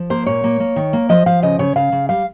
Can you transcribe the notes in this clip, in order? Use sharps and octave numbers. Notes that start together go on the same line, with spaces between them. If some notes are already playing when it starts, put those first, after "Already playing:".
Already playing: F3
A#3 C5
A#2 C#5
A#3
A#3
D#3
A#3
F3 D#5
F3 F5
C#3 D#5
C#3 C#5
C#3 F5
C#3
G3 F5